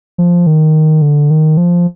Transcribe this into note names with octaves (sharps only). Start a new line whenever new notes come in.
F3
D#3
D3
D#3
F3